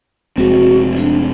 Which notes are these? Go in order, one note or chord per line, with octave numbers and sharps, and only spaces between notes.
F1 G#3 C4 F#4
D4